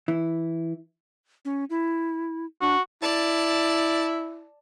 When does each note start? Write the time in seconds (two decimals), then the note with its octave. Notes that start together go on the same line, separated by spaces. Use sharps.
0.08 E3 E4
1.45 C#4
1.70 E4
2.61 D4 F#4
3.02 E4 D5 A5